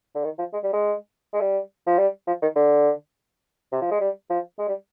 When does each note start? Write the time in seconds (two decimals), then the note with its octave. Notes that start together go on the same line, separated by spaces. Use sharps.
0.15 D3
0.24 D#3
0.39 F3
0.53 G#3
0.63 G3
0.73 G#3
1.33 G#3
1.41 G3
1.87 F3
1.98 G3
2.27 F3
2.42 D#3
2.56 D3
3.72 C3
3.81 F3
3.91 G#3
4.00 G3
4.30 F3
4.58 G#3
4.68 G3